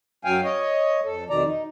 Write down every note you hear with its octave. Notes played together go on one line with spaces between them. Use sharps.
F#2 F#3 F5 G5 G#5
C#5 D#5
F2 A4
F2 B2 D#3 D5 A#5
D#4